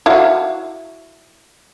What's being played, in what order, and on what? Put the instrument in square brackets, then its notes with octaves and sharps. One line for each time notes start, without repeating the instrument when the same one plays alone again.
[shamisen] E4 F#4 F5